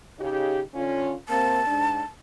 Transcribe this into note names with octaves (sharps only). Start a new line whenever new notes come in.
C#3 D#4 G4
D3 C#4 F4
C3 A#3 C4 A5
G#2 D4